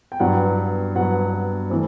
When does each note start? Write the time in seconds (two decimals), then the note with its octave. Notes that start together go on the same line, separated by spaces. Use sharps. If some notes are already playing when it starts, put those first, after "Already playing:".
0.12 G5
0.20 G2 F#3 B3 F#5
0.95 G2 F#3 B3 F#5
1.70 E3 A3 C4